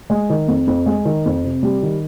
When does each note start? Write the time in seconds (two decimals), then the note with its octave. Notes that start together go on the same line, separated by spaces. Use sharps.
0.10 G#3
0.30 D#3
0.48 F2
0.67 F2
0.86 G#3
1.05 D#3
1.26 F2
1.44 C3
1.63 G3
1.83 D#3